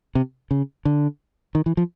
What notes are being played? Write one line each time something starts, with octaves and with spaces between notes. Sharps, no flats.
C3
C#3
D3
D#3
E3
F3